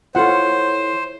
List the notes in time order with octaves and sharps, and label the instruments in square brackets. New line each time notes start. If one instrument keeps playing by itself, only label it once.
[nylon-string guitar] E3 A4 C#5 [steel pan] F4 F#5 [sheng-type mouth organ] C5